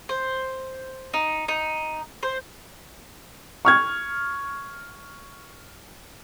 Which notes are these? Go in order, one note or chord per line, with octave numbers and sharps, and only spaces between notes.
C5
D#4
D#4
C5
C#6 F6 G#6